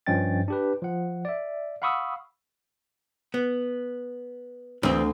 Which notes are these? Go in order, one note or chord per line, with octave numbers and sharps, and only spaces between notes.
G2 F3 C#4 D#5 G5 A6
D4 G4 B4
F3 F#5
D5 E5
F5 F#5 B5 C#6 D#6 E6
B3
D2 E3 C4